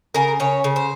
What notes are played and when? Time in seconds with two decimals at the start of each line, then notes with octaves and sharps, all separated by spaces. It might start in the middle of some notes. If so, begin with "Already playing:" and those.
0.14 C#3 A#4
0.40 C#3 C#5
0.64 C#3
0.76 C5